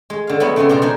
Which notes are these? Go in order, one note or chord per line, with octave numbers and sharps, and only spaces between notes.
G#3
D3 F5
F#3 G#3 A3 B3
C#3 G#3 A3 B3 C4 F4
B2 D4 F4 A#5
F3 D4 D#4 G#4 A#4